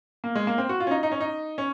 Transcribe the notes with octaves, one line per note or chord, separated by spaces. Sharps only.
A#3
G#3
A#3
C4
F#4
F4
C#4
D#4
D#4
C#4
D#4
C#4